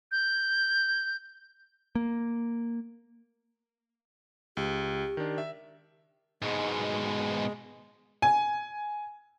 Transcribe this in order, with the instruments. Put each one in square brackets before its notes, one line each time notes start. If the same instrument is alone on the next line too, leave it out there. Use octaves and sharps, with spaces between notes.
[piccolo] G6
[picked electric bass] A#3
[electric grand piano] C#2 [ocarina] G4
[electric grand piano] D#3 D4
E5
[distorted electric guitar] G#2 B2 [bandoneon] G#3
[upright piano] G#5